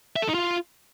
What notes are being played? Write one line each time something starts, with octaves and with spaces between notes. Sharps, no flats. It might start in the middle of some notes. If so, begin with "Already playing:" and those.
E5
A4
D#4
F4